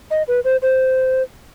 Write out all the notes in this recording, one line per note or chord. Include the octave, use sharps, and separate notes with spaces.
D#5
B4
C5
C5